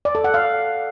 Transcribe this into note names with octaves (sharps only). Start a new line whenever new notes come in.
D5
A4
F#5
F5